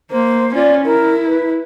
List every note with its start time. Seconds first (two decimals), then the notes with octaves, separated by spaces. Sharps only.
0.11 A#3 C5
0.55 C#4 F4 D5
0.85 E4 A#4
1.27 B4